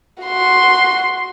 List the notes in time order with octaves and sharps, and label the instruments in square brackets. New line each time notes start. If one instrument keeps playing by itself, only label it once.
[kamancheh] F#4 C6